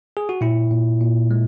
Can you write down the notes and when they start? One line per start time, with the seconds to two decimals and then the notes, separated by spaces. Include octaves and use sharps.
0.17 G#4
0.29 F#4
0.41 A#2 E4
0.71 A#2
1.01 A#2
1.31 G#3